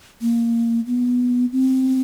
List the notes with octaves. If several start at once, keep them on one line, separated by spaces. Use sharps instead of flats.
A#3
B3
C4